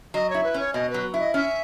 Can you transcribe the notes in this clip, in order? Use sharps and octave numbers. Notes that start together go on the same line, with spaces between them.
F#3 D#5
E4 C#5
B4
C#4 C#5
B2 D#5
F#3 B4
E4
D#5
C#4 E5